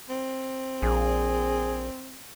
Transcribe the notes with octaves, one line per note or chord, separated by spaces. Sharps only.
C4
A#1 G#4